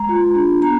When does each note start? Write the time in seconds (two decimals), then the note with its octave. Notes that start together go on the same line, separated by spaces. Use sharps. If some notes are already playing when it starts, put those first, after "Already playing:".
Already playing: G#3 A#5
0.09 F4
0.35 D4
0.62 B3 A#5